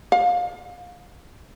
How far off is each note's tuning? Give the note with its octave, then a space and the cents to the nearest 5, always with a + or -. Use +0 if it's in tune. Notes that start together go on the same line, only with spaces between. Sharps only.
F5 +25